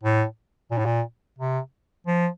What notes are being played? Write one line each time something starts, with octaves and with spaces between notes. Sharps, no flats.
A2
A#2
A2
A#2
C3
F3